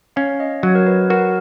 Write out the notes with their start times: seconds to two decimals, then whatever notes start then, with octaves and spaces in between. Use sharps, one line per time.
0.16 C#4 F5
0.40 D#5
0.63 F#3 C#5
0.75 A#4
0.87 B4
1.10 F#4 A#4